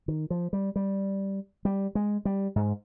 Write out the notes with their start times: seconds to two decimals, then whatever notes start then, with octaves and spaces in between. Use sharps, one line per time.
0.08 D#3
0.30 F3
0.53 G3
0.76 G3
1.65 G3
1.95 G#3
2.25 G3
2.56 G#2